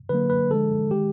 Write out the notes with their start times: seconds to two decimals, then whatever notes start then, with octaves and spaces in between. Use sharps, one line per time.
0.09 D3 F#3 A#3 B4
0.30 B4
0.50 D3 F3 G#3 A4
0.91 D#3 G#3 G4